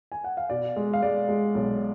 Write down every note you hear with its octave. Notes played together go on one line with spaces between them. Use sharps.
G#5
F#5
F5
B2 D5
G#3
F5
G#3 D5
G#3
B1